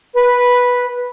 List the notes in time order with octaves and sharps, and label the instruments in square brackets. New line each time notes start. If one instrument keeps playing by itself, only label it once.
[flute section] B4